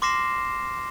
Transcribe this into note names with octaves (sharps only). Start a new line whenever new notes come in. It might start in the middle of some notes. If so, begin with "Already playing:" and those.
C6 D6 F6 A#6 C7 E7